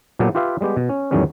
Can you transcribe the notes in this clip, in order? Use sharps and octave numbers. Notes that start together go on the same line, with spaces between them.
A#2 F#3 B3 G4 A4
F4 G4 B4 E5 F5
G3 G#3 B3 G4
B2
C#4
E2 A2 D#3 F#3 G3 C#4